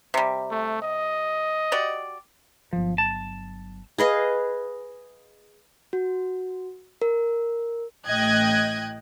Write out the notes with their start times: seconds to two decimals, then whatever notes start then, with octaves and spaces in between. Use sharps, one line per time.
0.14 C3 G3
0.51 A3
0.82 D#5
1.72 F#4 G4 D5
2.73 G1 F3 F#3
2.98 A5
3.98 G#4 B4 D#5 F5
5.93 F#4
7.02 A#4
8.07 A1 A2 D#5 G5 F#6 G#6